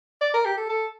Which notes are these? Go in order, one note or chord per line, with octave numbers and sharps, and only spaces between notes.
D5
A#4
G4
A4
A4